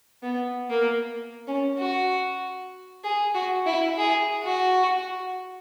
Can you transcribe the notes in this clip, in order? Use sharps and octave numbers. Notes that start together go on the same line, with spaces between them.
B3
A#3
C#4
F#4
G#4
F#4
E4
G#4
F#4